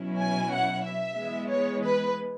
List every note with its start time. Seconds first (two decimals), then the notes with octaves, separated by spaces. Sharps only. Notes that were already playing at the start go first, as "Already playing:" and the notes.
Already playing: B2 F#3 C#4 E4
0.19 G#5
0.51 F#5
0.83 E5
1.17 E3 G#3 B3
1.49 C#5
1.81 B4